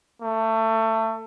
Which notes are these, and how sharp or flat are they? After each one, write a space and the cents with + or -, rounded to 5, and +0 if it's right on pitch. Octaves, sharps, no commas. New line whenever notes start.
A3 +20